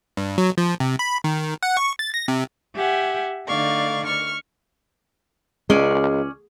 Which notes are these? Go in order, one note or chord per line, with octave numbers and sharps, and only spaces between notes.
G2
F#3
F3
C3
B5
D#3
F#5
C#6
A6
A#6
C3
G4 E5 F#5 G#5
D3 A3 D#4 D5 F5 C#6
C#6 F6
C#2 G#3 C#4 D5